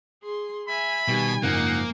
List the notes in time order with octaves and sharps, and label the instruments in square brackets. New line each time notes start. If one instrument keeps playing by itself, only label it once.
[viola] G#4 C6
[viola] E5 G#5 [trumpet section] B5
[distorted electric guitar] B2 [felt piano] D#3 G3 [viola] G#5
[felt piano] F#1 G#2 F3 [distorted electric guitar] A#3 [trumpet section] D#4 F#5